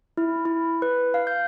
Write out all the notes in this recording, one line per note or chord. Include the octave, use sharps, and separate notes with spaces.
E4
E4
B4
F5
G6